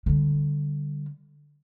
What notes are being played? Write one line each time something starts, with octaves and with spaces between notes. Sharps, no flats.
D3 G3